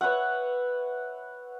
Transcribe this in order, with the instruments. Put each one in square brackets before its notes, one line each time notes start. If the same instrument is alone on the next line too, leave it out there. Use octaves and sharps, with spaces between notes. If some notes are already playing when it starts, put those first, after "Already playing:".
[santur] B4 C#5 E5 F#5